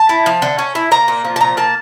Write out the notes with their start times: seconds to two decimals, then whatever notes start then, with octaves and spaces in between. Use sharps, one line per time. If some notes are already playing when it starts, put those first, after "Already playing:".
Already playing: A5
0.09 E4
0.26 F3
0.42 D3
0.59 C#4
0.75 E4
0.91 A#3 A#5
1.08 A#2
1.25 F3
1.36 A5
1.41 A#2 A#5
1.57 A#3 A5